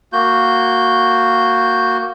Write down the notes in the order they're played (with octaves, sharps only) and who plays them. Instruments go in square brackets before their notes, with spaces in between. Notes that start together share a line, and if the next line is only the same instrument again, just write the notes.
[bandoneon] A#3 F#4 G6